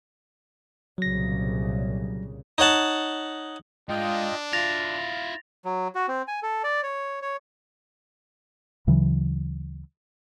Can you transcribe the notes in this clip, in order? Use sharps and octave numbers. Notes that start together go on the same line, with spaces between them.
C2 A#2 C#3 F#3 A#6
D#4 C#5 F#5 A5
G#2 D4 F4 D#5 G5
E4 F4 F5 A6 A#6 F7
F#3
F#4
C4
G#5
A4
D5
C#5
C#5
D2 C#3 E3 F#3